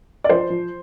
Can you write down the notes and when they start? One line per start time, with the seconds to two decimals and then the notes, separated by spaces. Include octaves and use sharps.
0.24 D5
0.29 F3 C5
0.50 F3